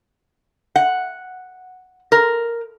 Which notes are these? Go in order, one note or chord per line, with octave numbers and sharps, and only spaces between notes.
F#5
A#4